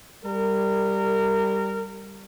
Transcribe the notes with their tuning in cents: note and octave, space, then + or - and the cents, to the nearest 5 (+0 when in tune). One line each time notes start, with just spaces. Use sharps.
G3 +0 A#4 -25